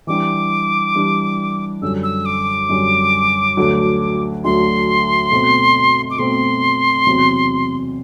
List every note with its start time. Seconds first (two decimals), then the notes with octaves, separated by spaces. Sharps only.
0.07 E3 G3 D4 G4 D6
0.95 E3 G3 D4 G4
1.82 F#2 D3 G3 E6
2.03 E6
2.26 D6
2.69 F#2 D3 G3
3.57 D2 D3 F#3
4.44 D2 D3 F#3 C6
5.32 B2 A3 C4
6.10 D6
6.19 B2 A3 C4 C6
7.06 E2 C3 F#3 C4